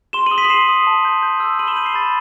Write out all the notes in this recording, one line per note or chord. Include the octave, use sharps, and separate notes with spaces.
C6 E7 G7
D#6 D#7 F#7
B6 D#7
F#7
C6 C7 E7
D#6
A5
G6
G6
E6
B5 D#7 F#7
E7 G7
G6 D#7 F#7
C7 E7
B5 A6